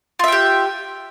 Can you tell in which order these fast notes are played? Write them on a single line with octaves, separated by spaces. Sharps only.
F4 E5 G5 G4